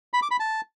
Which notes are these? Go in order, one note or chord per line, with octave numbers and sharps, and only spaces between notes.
B5
D6
B5
A5